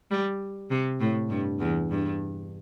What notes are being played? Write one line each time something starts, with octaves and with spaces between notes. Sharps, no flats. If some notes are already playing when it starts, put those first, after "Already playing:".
G3
C3
A2
G2
E2
G2